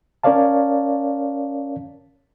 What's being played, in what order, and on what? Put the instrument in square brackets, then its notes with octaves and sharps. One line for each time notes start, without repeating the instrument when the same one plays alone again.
[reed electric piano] C#4 A#4 C#5 D5 F5 A5